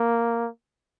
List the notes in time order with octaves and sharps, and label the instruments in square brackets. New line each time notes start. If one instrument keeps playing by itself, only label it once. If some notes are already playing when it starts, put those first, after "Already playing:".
Already playing: [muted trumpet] A#3